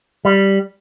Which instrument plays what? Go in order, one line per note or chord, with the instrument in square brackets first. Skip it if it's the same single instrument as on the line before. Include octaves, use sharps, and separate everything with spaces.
[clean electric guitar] G3